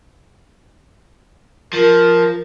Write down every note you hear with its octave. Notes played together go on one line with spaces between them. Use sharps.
F3 A#4